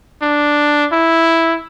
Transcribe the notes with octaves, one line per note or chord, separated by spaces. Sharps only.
D4
E4